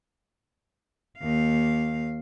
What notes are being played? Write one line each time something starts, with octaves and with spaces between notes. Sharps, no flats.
D#2 F5